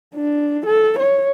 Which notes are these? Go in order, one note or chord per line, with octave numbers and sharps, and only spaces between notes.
D4
A4
C#5